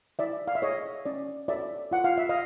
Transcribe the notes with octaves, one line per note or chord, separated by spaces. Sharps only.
E4 D5 E5
F5
E5
G#4 C#5 D#5
C#4 D5
F#4 A4 C#5 D5 E5
F4 F#5
F5
E5
D#5 F5